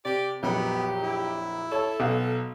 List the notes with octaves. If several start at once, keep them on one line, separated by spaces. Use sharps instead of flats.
C3 G4 D5
A#1 F2 F#3 B3 G4
E4
A4 C#5 A5
B1 F5 F#5